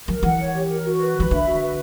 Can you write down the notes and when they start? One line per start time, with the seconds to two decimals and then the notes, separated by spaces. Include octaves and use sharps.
0.08 F#3 A#4
0.23 E3 F#5
0.39 C#5
0.54 G4
0.69 A#4
0.85 F#4
1.00 B4
1.15 E3 B5
1.31 D3 E5
1.46 F#4
1.61 B4